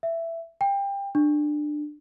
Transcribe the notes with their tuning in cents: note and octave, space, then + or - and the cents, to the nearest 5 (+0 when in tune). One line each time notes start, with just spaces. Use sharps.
E5 +10
G5 +25
D4 +20